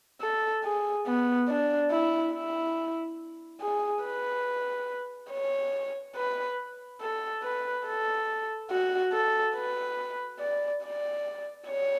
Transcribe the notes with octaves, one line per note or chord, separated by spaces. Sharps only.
A4
G#4
B3
D4
E4
E4
G#4
B4
C#5
B4
A4
B4
A4
F#4
A4
B4
D5
D5
C#5